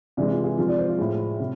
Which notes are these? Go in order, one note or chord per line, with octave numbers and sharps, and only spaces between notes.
C3 E3 G#3 D5
F4
G#4
C3 F3 G#3 F4
D5
C5
F4
A2 G#3
C3